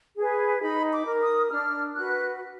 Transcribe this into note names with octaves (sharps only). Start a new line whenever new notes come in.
G#4 B4
D#4 B5
D6
A#4
D#6
D4 F6
F#4 B4 F#6